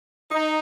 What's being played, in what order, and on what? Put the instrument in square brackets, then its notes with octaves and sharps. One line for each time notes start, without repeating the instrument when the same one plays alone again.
[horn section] D#4